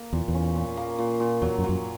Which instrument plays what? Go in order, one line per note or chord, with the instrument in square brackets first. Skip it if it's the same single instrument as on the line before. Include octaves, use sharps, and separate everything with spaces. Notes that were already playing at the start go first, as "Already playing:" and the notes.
Already playing: [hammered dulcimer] A#3
[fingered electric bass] E2 [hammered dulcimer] A#2
[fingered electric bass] E2
[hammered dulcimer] C#4
A#2
A#3
A#2
A#2
[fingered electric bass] E2 [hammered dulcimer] F#3
[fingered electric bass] F#2
[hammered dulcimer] F#3
[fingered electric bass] F#2